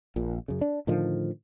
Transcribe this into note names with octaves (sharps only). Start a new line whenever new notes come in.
A#1 A#2
F#2 C#3
D4
A2 D3 D#3 F3